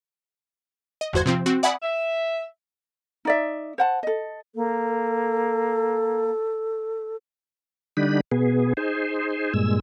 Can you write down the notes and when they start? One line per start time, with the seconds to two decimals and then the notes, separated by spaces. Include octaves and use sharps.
1.01 D#5
1.13 G1 E2 F#4 C5 G#6
1.26 C3 F3 C4
1.46 C4 F#4
1.63 D5 E5 F#5 G#5 B5 D#6
1.82 E5
3.25 D#4 D5 E5
3.78 C5 F#5 A5
4.03 A4 D#5
4.56 A#3 A4
7.97 D3 G3 D4 D#4 B5
8.31 B2 B3 G#4
8.77 D#4 G#4 C5
9.54 G2 A#2 G#3 E6